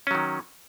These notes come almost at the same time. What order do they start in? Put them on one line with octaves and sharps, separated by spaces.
C#4 F#3 D#3